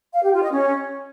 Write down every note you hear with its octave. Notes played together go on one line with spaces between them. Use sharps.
F5
G4
F4
D#5
C#4